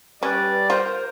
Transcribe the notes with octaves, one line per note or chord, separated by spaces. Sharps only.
G3 C#4 B4 D5
F4 A#4 C5